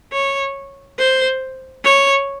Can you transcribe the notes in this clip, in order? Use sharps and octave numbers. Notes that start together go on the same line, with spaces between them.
C#5
C5
C#5